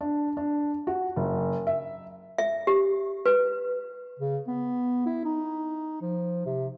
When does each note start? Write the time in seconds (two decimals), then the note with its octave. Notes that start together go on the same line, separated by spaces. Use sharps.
0.01 D4
0.37 D4
0.87 F#4
1.16 F#1
1.67 E5
2.38 E5
2.67 G4
3.26 B4
4.19 C#3
4.47 B3
5.06 E4
5.25 D#4
6.02 F3
6.46 C3